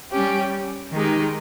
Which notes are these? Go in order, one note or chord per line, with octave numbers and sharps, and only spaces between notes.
G3 C#4 G4
D#3 G#3 D#4 G4